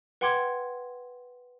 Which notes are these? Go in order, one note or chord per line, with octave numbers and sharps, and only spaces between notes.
B4 F#5 G5 C6 D6 G#6